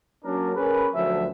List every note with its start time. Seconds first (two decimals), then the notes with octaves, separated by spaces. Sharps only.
0.25 F#3 A#3 C#4 D4 A#4
0.56 C#4 G#4 A#4 B4
0.95 D2 F3 F#3 E5